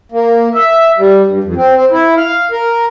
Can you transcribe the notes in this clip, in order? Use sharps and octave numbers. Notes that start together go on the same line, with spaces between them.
A#3
E5
G3
G2
F2
C4
C4
E4
F5
A#4